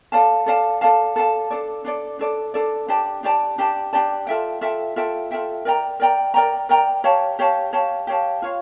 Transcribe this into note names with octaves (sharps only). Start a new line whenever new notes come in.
A4 D5 F5 A5
A4 D5 F5 A5
A4 D5 F5 A5
A4 D5 F5 A5
D4 A4 D5
D4 A4 D5
D4 A4 D5
D4 A4 D5
D4 G4 D5 A5
D4 G4 D5 A5
D4 G4 D5 A5
D4 G4 D5 A5
F4 A4 E5 G5
F4 A4 E5 G5
F4 A4 E5 G5
F4 A4 E5 G5
A#4 D5 G5 A#5
A#4 D5 G5 A#5
A#4 D5 G5 A#5
A#4 D5 G5 A#5
G4 C#5 F5 A5
G4 C#5 F5 A5
G4 C#5 F5 A5
G4 C#5 F5 A5
F4 C#5 F5